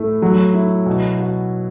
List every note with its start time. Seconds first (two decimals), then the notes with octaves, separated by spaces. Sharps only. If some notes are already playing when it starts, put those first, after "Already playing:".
Already playing: A2 A3
0.22 F#3
0.54 E4
0.86 B2
1.19 F#4